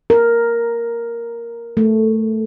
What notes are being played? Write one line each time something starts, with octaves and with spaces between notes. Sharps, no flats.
A#4
A3